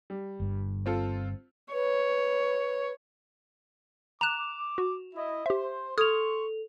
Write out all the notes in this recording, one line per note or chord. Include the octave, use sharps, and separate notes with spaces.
G3
G1 G2
C4 F4 A4
B4 C#5
A#5 D6 F#6 E7 F7
F#4
E4 D#5
G4 C5 E5
A4 C6 C#6 D#6 F6 G#6 F7